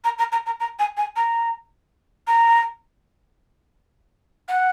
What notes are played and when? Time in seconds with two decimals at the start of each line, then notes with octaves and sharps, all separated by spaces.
0.04 A#5
0.19 A#5
0.32 A#5
0.46 A#5
0.60 A#5
0.79 G#5
0.97 G#5
1.16 A#5
2.27 A#5
4.49 F#5